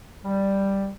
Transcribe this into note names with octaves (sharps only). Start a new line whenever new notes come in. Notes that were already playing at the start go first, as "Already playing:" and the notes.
G3